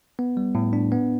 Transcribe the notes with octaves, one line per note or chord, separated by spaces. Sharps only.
B3
G3
A2
D4
B3